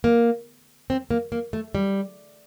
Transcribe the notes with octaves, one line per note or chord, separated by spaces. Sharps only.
A#3
C4
A#3
A#3
A3
G3